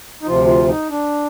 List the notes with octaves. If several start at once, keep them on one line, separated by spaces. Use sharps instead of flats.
D#4
D2 C3 F3 F4
F4
D#4
D4